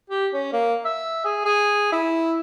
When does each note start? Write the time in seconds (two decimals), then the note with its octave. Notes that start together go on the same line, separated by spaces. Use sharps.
0.10 G4
0.33 C#4
0.53 A#3
0.85 E5
1.25 G#4
1.45 G#4
1.92 E4